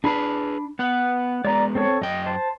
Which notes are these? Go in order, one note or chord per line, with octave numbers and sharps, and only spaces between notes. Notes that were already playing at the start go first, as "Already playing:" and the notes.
D4 G#4 B4 B5
B3 B4 F#5
G#3 B3 D5 A#5
C4 A4 C#5
F#2 D#5 G5
C5 A5